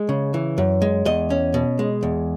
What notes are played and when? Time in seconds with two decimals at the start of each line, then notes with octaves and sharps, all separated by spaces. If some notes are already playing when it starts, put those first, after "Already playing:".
Already playing: G#3
0.09 C#3
0.34 E3
0.58 F#2
0.82 G#3
1.05 E2 D#5
1.30 C#4
1.54 B2
1.79 G#3
2.03 E2